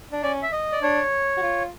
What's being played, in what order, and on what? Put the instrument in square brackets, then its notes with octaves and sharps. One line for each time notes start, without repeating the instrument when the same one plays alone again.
[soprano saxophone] D4
[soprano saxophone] C#4 [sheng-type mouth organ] D5
[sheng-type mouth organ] E5
D#5
D5
[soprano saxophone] D4 [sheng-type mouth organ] C#5
[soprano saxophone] F#4
F4